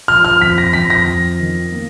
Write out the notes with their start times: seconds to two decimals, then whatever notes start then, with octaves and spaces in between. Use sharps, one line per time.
0.08 F3 F6
0.25 F6
0.41 F2 B6
0.58 A#6
0.73 F2 B6
0.90 A#6
1.06 F2
1.40 D#3
1.72 A#3